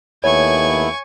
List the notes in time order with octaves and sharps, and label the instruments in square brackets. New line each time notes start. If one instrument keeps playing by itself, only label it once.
[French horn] D#2 [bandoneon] A3 B3 E4 [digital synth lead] C#5 [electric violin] G#5 C#6